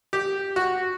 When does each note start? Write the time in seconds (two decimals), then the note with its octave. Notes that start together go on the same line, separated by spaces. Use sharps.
0.13 G4
0.56 F#4